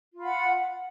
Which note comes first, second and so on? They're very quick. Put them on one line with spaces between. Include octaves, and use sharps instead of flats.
F4 F5 B5 F#5